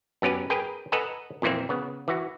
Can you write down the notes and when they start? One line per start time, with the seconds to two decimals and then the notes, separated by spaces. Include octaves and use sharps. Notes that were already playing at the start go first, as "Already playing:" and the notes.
0.22 F#2 B3 C#4 G4 B4
0.50 G#4 A#4 B4 G5 G#5
0.92 A4 B4 D#5 F#5 G#5 A#5
1.42 F2 A#2 E3 A#3 C4
1.69 C#3 B3
2.08 E3 F#4